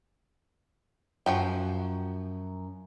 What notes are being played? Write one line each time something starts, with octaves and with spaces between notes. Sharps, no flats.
F#2 F3 F#4 G5